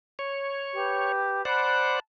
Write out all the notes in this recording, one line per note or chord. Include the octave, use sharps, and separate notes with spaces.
C#5
G4 B4
C5 D5 F#5 A5 B5 F#6